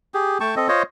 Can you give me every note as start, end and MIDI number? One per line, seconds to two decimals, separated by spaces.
0.14 0.38 67
0.14 0.38 68
0.40 0.55 57
0.40 0.55 79
0.40 0.55 81
0.40 0.55 85
0.56 0.68 60
0.56 0.68 69
0.56 0.68 75
0.68 0.83 65
0.68 0.83 72
0.68 0.83 73
0.68 0.83 75